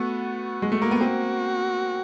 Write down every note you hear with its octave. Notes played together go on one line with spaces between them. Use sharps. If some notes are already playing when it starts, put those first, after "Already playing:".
Already playing: A3 B3 F#4
G#3
A3
A#3
B3
A#3 C4 F#4